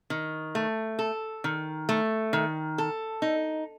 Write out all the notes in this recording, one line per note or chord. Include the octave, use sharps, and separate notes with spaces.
D#3
A3
A4
D#3
A3
D#3
A4
D#4